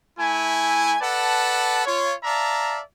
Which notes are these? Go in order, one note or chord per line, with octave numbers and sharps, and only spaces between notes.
A3 E4 G#5
A4 B4 D5 F#5 A5
F4 C#5
D5 E5 F5 A5 A#5